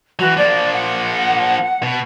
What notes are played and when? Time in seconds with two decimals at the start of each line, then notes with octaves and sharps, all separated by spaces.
0.19 E3 F#3 F#4
0.37 F3 A#3 D5
0.73 F#5
1.83 B2